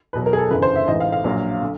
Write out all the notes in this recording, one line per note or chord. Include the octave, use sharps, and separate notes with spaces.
E2 B2 F#3 B4
A#4
G#4
A4
G1 F#2 C#3 E3 B4
C5
E5
A1 G#2 E3 D#5
F5
F5
A#1 A#2 F#3
D3